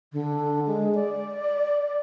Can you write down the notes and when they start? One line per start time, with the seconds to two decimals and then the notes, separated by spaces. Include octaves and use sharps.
0.13 D3
0.66 G#3
0.95 D5